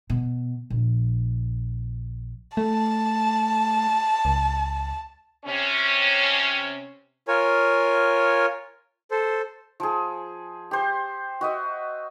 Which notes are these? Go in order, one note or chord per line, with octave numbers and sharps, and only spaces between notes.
B2
A#1
A3 A5
C#2
C3 C#4
F4 A#4 C#5 G#5
A4 C5
F3 G#4
G4 C5
F#4 D#5 E5